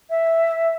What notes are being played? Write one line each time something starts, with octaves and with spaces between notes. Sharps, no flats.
E5